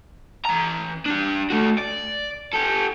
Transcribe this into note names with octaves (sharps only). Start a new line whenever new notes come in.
E3 A#5
D4 G4
A3 F#4
D5
G4 A4